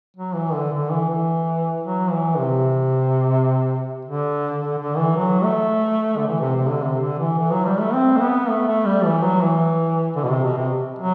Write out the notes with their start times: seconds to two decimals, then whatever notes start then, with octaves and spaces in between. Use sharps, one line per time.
0.16 F#3
0.35 E3
0.53 D3
0.72 D3
0.90 E3
1.09 E3
1.83 F#3
2.11 E3
2.38 C3
4.05 D3
4.61 D3
4.78 D3
4.97 E3
5.16 F#3
5.43 A3
6.17 D3
6.28 E3
6.40 C3
6.55 C3
6.69 D3
6.83 C3
7.01 D3
7.19 E3
7.38 E3
7.52 F#3
7.65 G3
7.80 A3
7.94 C4
8.17 A3
8.21 B3
8.49 A3
8.68 A3
8.85 G3
9.05 E3
9.23 F#3
9.42 E3
10.16 D3
10.24 B2
10.29 C3
10.43 B2
10.57 C3
10.99 F#3